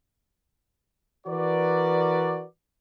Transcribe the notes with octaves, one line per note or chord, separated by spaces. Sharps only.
E3 F#4 A#4 B4 D5